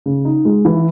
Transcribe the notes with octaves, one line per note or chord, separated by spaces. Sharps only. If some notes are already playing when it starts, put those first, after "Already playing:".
C#3
D#4
G#3
E3